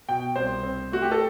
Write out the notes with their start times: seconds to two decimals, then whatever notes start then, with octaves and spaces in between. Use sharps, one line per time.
0.09 B2 G5
0.36 C2 C5
0.63 C4
0.92 A3 F#4
1.02 G4
1.12 A4